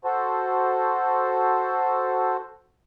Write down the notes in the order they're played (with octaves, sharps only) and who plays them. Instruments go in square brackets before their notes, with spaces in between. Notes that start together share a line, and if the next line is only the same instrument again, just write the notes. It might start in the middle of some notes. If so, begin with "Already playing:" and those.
[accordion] F#4 A4 C5